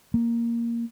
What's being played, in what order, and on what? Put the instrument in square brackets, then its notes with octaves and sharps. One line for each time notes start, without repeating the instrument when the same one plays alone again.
[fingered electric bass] A#3